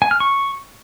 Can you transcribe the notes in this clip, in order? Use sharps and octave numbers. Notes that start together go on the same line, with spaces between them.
G#5
F6
C#6